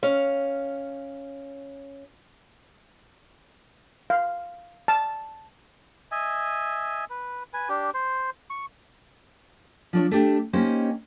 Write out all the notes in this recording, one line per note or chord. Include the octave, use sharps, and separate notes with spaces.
C#4 F5
F5
A5
D#5 E5 G#5
B4
B4 G#5
D4 G4
C5
C#6
F3 D4 C#5
A3 D4 G4
A#3 C#4 D#4 G4 C5